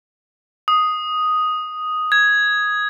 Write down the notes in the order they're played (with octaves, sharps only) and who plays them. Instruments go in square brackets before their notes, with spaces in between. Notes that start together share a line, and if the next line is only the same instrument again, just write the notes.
[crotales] D#6
G#6